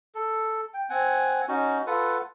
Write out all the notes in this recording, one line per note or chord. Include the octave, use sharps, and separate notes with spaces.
A4
G5
C4 F#5 G#5
C#4 D#4 F#4
F4 A4 B4 F#5